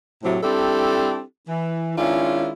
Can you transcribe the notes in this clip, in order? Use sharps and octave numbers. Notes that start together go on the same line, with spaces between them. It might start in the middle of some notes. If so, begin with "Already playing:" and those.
A2 C3 F#3
G3 C4 D4 E4 G4 A4
E3
D#3 G#3 C#4 D4 E4 F4